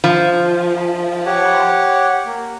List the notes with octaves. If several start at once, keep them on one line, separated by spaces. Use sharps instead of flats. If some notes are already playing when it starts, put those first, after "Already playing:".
F3
G4 C#5 F#5
A#3